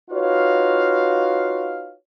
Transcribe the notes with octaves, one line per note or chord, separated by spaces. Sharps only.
D#4 F4 F#4 B4 C#5 F5